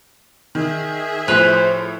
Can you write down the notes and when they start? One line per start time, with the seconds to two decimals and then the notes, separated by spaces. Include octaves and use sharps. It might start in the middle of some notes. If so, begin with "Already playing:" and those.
0.55 D#3 G#4 E5
1.28 A2 F3 B4 C5 F7